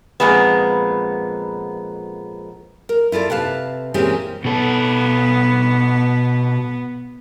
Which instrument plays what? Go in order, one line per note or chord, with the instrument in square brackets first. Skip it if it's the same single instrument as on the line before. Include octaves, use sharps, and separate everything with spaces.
[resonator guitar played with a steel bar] F2 A#2 G#3 B3
[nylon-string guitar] A#4
E4 F4 A4 D5
C3 B4 F5 A5
A#2 E3 G#3 C4 C#4 G4
[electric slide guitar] B2 A4 [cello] B3